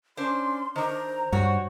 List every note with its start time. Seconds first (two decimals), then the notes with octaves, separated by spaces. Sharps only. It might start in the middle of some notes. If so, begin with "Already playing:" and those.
0.17 C#4 D4 C5 C6
0.76 D#3 D4 C5 A#5
1.32 G2 F#4 C#5